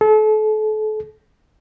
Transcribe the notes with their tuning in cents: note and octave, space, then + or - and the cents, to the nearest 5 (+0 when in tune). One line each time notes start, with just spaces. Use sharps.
A4 -35